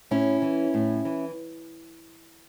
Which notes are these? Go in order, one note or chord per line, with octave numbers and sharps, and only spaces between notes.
A2 C#4 E4
E3
A2
E3